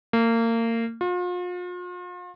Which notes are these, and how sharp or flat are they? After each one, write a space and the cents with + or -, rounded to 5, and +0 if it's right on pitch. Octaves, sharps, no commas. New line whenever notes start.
A#3 -30
F4 +40